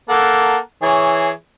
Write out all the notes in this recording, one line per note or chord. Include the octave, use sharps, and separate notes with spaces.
A#3 A4 F#5
E3 G#4 C#5